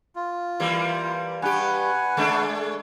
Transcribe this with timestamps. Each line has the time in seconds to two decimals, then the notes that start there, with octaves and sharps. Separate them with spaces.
0.16 F4
0.60 E3 G3 A#3
1.42 G2 G4 B4 F#5 G#5
2.17 G#3 A3 D4